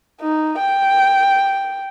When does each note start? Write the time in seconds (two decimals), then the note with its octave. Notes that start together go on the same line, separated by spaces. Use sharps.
0.21 D#4
0.58 G5